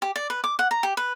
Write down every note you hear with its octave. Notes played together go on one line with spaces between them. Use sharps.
G4
D5
B4
D6
F#5
A#5
G4
B4